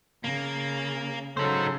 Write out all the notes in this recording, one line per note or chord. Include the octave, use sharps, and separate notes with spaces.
C#3 A#3
C#3 F#3 D#4 A4 C5